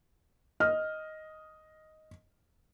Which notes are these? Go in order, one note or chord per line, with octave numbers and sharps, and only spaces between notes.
D#5 F6